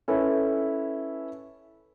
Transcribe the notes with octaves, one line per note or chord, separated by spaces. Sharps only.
C#4 E4 A4 B4